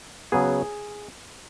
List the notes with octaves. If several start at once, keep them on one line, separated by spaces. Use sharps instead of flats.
C#3 F#3 B3 G#4